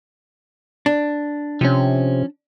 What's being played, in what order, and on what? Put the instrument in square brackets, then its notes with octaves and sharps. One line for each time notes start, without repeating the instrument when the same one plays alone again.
[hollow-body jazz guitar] D4
[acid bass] C3 [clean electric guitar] F3 C#4